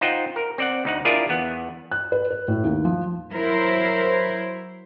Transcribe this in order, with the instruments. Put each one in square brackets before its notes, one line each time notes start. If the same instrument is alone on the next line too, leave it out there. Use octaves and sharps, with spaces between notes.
[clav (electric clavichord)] D#4 F4 C5 F#5 G5
A#4
C4 D5 F#5
D2 D#4 F#5
D4 E4 F4 G#4 A#4 D5
E2 B3 F#5
[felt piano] F#6
B4
B4
A2
D#2
F3
[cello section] F#3 E4 A#4 C5